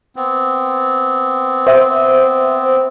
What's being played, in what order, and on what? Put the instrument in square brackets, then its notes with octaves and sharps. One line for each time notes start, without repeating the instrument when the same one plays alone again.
[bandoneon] B3 C4
[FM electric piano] C5 E5